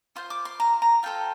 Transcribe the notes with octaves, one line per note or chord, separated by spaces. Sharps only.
F4 C5 C6
D6
C6
A#5
A#5
F4 A4 C5 G5